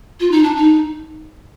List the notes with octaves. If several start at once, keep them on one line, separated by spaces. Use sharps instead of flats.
F4
D#4
D4
D#4